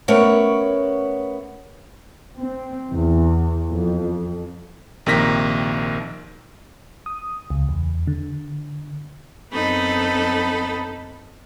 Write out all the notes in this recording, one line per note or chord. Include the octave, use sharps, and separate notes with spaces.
A3 B3 C#4 A#4 C#5 F#5
C4
E2
F2
A#1 C3 D#3 A#3 A#6 B6
D#6
C#2
E2
D3
F#2 B3 C4 D#4 A4 B5